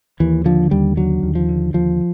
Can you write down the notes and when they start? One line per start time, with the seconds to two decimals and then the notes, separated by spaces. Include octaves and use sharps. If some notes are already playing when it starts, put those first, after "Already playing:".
0.20 D#2 E3
0.45 D3 F3
0.71 D#2 G3
0.97 D3 F#3
1.23 D#2
1.35 F3
1.49 D3
1.74 D#2 F3